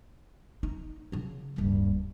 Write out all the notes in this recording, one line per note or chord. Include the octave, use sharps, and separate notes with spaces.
D#4
C#3 F#3
D1 G2 A#3